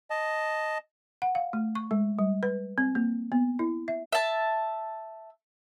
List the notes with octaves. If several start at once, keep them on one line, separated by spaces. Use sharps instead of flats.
D#5 A5
F#5
F5
A3
C#6
G#3
G3
B4
C4
A#3
B3
E4
E5
E5 A5